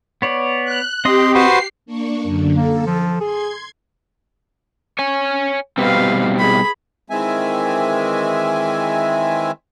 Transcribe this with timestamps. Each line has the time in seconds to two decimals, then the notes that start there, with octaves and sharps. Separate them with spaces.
0.22 B3 C#5 D5
0.65 F#6
1.05 C4 G4 D#5 C6 D#6
1.35 F#4 B4 C5 C7
1.86 A#3 D4 C#6
2.23 F#2 D3
2.56 A#3 A4
2.86 F3
3.21 G#4 C6 G#6
4.99 C#5 G#5
5.78 B2 G3 C4 B4 F5
6.38 G#4 B5
7.10 D#3 E3 G#3 C4 E5 G#5